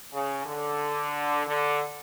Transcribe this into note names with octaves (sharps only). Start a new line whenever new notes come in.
C#3
D3
D3